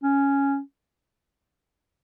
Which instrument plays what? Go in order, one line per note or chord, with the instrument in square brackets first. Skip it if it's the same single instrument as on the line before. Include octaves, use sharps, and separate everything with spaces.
[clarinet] C#4